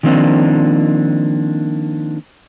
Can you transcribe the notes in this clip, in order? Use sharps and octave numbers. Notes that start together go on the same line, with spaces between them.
D#3 F3 A#3 C4 D4 D#4